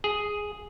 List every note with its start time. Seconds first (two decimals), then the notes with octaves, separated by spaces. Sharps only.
0.04 G#4